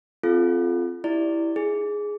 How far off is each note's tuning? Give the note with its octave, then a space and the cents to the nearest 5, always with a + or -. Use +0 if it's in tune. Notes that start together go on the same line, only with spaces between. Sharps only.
C4 +0 F4 +0 A4 -35
E4 +0 G4 +0 D5 +0
D#4 -35 G#4 +0